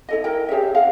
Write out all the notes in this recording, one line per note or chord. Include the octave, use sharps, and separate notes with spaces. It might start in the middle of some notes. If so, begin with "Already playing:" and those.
E4 A4 D#5
E4 A#4 G5
G4 G#4 C#5 E5
F5 F#5